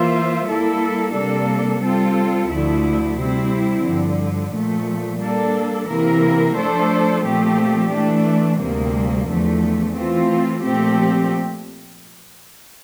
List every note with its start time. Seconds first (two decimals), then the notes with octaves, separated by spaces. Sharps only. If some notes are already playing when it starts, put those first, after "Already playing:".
Already playing: E3 A#3 F4 C5 E5
0.44 G3 A#3 E4 A4
1.13 C3 G3 A#3 D4 A4
1.80 G3 C4 F4 A4
2.49 D2 D3 F3 A3 E4
3.17 C3 G3 C4 E4
3.85 G2 D3 F3
4.52 A#2 F3 A3
5.20 G3 A#3 D4 A4
5.88 C3 E3 A#3 E4 A#4
6.56 F3 A3 D4 A4 C5
7.24 A#2 F3 A3 C4 G4
7.91 E3 A3 D4
8.59 D2 C3 G3 A#3
9.27 E2 D3 F3 A3
9.95 E3 A3 C4 F4
10.63 A#2 F3 A3 C4 G4